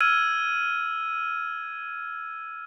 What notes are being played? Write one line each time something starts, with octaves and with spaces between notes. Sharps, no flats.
E6 F6 G#6 D#7